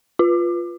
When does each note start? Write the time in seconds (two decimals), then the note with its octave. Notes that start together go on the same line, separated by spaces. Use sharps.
0.19 F4